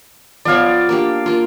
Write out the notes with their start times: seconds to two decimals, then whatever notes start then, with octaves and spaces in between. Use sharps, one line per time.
0.45 F3 B3 C#5 D5 F5
0.89 A#3 D4 G4
1.26 A#3 F4